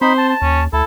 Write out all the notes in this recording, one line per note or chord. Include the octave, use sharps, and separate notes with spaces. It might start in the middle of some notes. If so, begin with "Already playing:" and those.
C4 D#4 C5 B5
A5
A5
D#2 C#4
D2 E4 A4